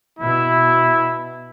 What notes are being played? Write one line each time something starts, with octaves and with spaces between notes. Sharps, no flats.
B2 E4